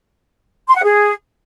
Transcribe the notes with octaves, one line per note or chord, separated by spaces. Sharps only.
C6
F#5
G#4